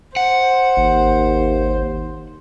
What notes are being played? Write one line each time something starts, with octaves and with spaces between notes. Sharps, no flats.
C5 F#5
G#1 D#2